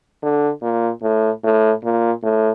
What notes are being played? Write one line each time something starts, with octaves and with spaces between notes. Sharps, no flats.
D3
A#2
A2
A2
A#2
A2